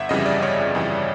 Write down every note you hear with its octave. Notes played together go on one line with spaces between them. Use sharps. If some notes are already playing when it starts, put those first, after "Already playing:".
Already playing: G1 E5 F#5
F2 C#3 E3 G3 D#5
D5
G1 C#5
F2 C#3 E3 G3